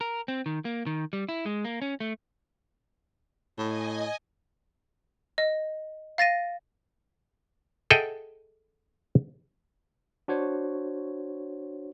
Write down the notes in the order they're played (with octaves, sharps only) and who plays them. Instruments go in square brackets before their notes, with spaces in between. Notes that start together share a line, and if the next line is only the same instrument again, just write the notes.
[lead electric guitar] A#4
C4
D#3
A#3
D#3
G3
E4
G#3
A#3
C#4
A3
[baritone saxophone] A2 [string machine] D#5 G#5
[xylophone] D#5
F5 A6 A#6 D#7
[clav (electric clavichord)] G#4 A4 D#5 E5 F#5 G5
[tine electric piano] D4 F#4 C5 C#5